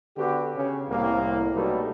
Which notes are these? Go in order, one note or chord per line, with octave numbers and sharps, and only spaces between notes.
D3 B3 F#4 G4
C#3
C2 A2 A#3
B2 F#3 G3 A3 B3 D#4